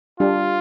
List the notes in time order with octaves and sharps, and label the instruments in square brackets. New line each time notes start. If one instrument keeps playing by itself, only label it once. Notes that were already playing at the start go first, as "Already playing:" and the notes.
[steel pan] G3 D4 G4 [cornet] F4